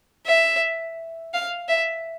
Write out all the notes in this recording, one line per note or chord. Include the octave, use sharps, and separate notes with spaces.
E5
F5
E5